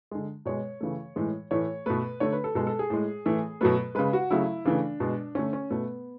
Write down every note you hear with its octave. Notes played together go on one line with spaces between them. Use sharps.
D3 G#3
B2 G#3 C#5
C#3 E3 A3
A2 E3 G#3
A2 E3 A3 C#5
B2 A3 B4
D3 A3 C#5
B4
A4
B2 G#3 A4
A4
G#4
A2 G#3
A2 E3 A3
B2 F#3 A3 B4
C#3 G#3 B4
F#4
C#3 F#3 A3 E4
C#3 E3 A3 D4
B2 G#3
D3 A3 C#4
C#4
B2 A3 B3